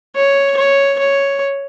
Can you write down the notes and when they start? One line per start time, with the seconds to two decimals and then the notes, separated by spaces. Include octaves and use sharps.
0.16 C#5
0.57 C#5
0.99 C#5